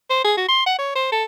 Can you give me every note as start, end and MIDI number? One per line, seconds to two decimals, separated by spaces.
0.10 0.22 72
0.24 0.34 68
0.37 0.46 66
0.48 0.63 84
0.66 0.74 78
0.78 0.91 73
0.95 1.07 72
1.12 1.24 69